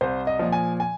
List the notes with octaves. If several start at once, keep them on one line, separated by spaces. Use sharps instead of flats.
C2 C5
D#5
A#2 F3
G#5
G#5